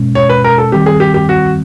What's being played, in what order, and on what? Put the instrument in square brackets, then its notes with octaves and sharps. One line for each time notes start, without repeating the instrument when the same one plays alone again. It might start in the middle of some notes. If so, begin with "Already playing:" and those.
Already playing: [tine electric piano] B2 G#3 C#4
[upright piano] C#5
B4
A#4
A4
[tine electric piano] D#3 G3 C4 [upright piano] G4
[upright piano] G#4
G4
G4
F#4